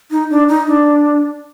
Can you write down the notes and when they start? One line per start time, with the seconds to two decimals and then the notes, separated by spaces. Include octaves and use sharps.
0.11 D#4
0.30 D4
0.48 D#4
0.67 D4